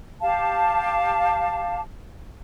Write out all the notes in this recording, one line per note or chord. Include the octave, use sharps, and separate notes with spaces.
G4 F5 A5